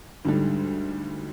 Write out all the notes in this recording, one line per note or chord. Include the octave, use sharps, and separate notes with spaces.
D2 G#2 D3 G3